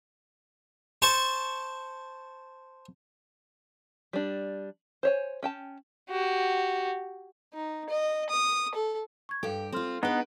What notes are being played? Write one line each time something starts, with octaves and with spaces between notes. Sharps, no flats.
C5 A5 C#6
G3 D4
C5 C#5 G#5
C#4 G5 A5
F#4 G4
D#4
D#5
D#6
A4
C#6 G#6
G2 G4 A4 F5 G5
C4 F4 A4 C6 F6
B3 D4 D#4 G#4 B4 G5 G7